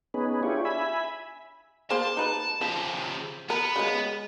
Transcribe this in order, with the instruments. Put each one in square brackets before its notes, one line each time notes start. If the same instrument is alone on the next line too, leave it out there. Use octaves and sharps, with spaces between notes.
[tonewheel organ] B3 C#4 D#4 G#4 B4
D4 E4 F4 G4 G#4 C#5
E5 G#5 B5
[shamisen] A#3 G#4 C5 [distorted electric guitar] A5
[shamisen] D#4 B4
[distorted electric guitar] C#3 G4 [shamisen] F3
[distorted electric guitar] B3 B4 [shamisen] A#4
[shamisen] C#3 F#3 G#3